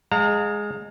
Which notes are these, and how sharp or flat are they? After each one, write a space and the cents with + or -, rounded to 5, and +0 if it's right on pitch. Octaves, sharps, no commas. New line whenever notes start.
G#3 +0 F5 +35 A#5 -35